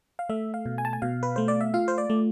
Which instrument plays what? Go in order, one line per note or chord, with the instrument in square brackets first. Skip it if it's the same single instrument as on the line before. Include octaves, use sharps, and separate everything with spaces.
[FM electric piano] F5
A3 E5
F5
B2
G#5
A5
G#5
B2 F5
B4
A3 C5
D5
E5
F4 F5
C5
D5
A3